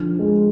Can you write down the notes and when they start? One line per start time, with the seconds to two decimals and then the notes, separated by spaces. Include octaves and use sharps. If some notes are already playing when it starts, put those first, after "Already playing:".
Already playing: D3 F3
0.19 G#3